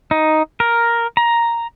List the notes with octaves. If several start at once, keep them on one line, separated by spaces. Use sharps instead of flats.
D#4
A#4
A#5